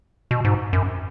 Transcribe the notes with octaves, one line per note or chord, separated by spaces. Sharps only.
B2
G#2
F#2